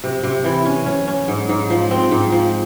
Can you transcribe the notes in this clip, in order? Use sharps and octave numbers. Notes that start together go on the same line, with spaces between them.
C3
C3
E3
C#4
C#4
C#4
G#2
G#2
F3
C4
G#2
F3